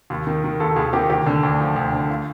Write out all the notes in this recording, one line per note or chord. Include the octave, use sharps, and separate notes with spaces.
D#2
D#3
D#3
D#2 A4
D#2 G#4
D#3 G4
D2 G4
D3
D2
F3
D2
D3
F4